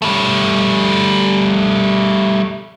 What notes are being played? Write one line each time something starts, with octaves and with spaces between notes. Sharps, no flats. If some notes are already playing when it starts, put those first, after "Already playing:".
G3 A3